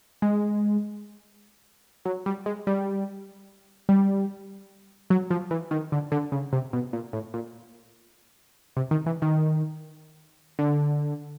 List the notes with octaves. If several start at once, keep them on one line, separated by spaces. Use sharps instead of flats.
G#3
F#3
G3
G#3
G3
G3
F#3
F3
E3
D#3
D3
D3
C#3
C3
B2
A#2
A2
A#2
C3
D#3
E3
D#3
D3